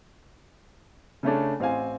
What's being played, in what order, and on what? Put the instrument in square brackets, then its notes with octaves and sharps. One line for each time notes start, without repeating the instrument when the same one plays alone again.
[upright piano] C#3 A3 C#4 D4
A1 C4 F5 G#5